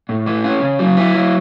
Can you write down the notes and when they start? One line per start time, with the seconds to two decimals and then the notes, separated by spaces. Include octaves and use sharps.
0.09 A2
0.26 E3
0.44 C#4
0.62 C#3
0.79 F#3
0.97 E4
1.14 F#3